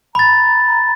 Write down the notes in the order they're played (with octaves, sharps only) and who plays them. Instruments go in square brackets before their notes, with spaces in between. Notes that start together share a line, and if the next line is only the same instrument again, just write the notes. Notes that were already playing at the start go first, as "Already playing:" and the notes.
[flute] A#5 [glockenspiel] B5 A6